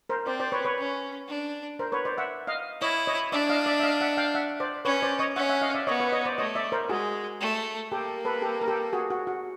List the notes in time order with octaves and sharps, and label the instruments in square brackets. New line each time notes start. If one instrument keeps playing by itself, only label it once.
[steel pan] A#4 C5
[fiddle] C4 [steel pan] C5 D5
[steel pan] C5 D5
B4 C#5
B4 C#5
[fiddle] C#4
D4
[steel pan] A#4 C5
B4 C#5
C5 D5
E5 F#5
D#5 F5
[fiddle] E4 [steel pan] C#5 D#5
[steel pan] C#5 D#5
[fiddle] D4 [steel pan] D5 E5
[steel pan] D#5 F5
D5 E5
E5
D#5 F5
E5 F#5
F5 G5
E5 F#5
C5 D5
[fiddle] C#4 [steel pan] B4 C#5
[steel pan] C5 D5
C#5 D#5
[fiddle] C#4 [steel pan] E5 F#5
[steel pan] E5 F#5
D#5 F5
D5 E5
[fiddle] B3 [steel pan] C#5 D#5
[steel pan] B4 C#5
C#5 D#5
C5 D5
[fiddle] A3 [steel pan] C#5 D#5
[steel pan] D5 E5
A#4 C5
[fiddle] G#3 [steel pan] F#4 G#4
[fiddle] A3
[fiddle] A#3 [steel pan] G4 A4
[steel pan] A4 B4
G4 A4
A#4
G4 A4
F#4 G#4
F#4
F#4